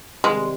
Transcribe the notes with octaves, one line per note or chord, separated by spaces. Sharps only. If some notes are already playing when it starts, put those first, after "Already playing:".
C3 D#3 G3 G#3